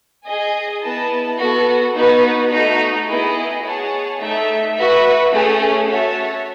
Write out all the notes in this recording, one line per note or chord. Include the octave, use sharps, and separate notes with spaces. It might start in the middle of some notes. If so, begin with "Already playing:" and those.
G#4 D#5 G#5
B3 E4 B4 D#5 A5
B3 F#4 A4
B3 D#4 F#4 B4
A3 D#4 F#4
B3 E4 G#4 D#5
G#4 C#5 F#5 A5
A3 D#4 A4 E5
F#4 B4 E5
A3 C#4 G#4
F#4 C#5 E5 A5